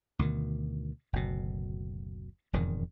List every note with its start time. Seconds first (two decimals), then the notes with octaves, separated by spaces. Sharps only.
0.19 D2 B2 D#3
1.13 F#1 D2 B2
2.53 E1 F2 G#2 D#3